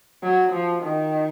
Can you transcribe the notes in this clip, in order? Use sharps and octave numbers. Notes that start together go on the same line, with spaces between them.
F#3
F3
D#3